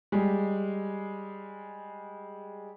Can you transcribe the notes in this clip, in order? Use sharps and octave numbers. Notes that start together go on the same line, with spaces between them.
G3 G#3